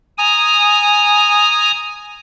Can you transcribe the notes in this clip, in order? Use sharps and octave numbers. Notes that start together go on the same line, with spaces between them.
G#5 A#5 D#6